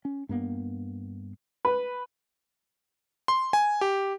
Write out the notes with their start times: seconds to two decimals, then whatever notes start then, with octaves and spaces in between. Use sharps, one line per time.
0.05 C#4
0.29 G2 A#3 B3
1.65 B4
3.28 C6
3.53 G#5
3.81 G4